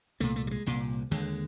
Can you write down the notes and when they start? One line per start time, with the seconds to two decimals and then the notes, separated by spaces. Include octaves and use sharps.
0.20 C2 A#2 A3
0.36 A3
0.47 G3
0.51 G#3
0.66 C2 A#2
1.11 D#2 D3 G#3